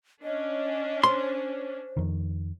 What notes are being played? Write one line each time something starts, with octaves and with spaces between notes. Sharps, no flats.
C#4 D4 D#5
C5 C6
F2 D#3